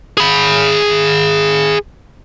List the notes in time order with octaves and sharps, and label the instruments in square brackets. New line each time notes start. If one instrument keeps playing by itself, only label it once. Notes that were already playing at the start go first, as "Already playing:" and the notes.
[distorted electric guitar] G#4 B5